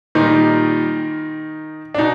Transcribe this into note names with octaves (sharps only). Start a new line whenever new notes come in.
A#2 D#3 D#4
G3
D4
B2 D#4